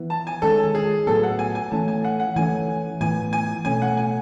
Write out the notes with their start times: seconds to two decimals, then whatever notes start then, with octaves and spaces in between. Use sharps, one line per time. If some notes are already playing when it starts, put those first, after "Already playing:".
Already playing: E3 B3
0.10 A5
0.27 G#5
0.42 D#3 G#3 C#4 A4
0.75 G#4
1.07 A2 F#3 B3 A4
1.23 F#5
1.39 G#5
1.55 G#5
1.71 E3 A3 C#4 A5
1.88 G#5
2.04 F#5
2.20 F#5
2.36 E3 A3 C#4 G#5
3.01 A2 E3 B3 G#5
3.33 G#5
3.65 B2 A3 C#4 G#5
3.82 F#5
3.97 G#5